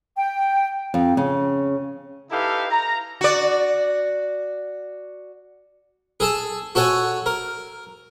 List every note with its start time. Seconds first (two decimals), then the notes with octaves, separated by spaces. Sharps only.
0.17 G5
0.94 F2
1.17 C#3
2.31 D#4 E4 G4 A4 B4 F5
2.70 A#5
3.21 F#4 D5
6.20 G#4 A4 A5
6.75 F#4 A4 C#5 F#5 G#5
7.26 A#4